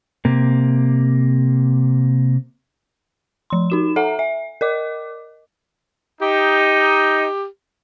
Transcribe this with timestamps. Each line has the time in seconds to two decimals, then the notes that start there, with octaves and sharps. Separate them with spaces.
0.25 C3 A#3
3.50 F3 C6
3.70 D#4 F#4 E7
3.96 A4 E5 F#5 A#5
4.19 E5
4.61 A#4 D#5 D6
6.21 D#4 G4